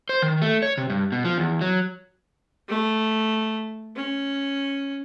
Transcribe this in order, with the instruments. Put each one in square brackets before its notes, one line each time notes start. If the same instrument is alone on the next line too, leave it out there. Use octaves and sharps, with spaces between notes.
[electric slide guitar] C5
D#3
A3
C#5
C3
G2
B2
F3
E2
F#3
[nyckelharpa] A3
C#4